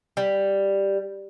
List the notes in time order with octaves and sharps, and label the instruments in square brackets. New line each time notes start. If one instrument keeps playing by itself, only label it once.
[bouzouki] G3